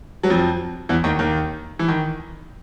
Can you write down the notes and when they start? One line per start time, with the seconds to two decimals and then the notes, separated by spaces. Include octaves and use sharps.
0.23 F#3
0.30 F2 F3
0.89 E2 E3
1.04 D#2 D#3
1.19 D#2 D#3
1.79 E3
1.88 D#3